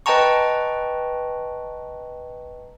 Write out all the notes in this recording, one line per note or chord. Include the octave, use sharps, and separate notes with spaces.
B4 D#5 G5 A5 A#5 C#6